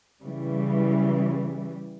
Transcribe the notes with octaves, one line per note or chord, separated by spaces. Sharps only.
C#3 E3 G3